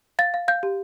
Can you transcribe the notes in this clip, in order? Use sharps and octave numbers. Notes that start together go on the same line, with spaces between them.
F5 A6
F5
F5 G6
G4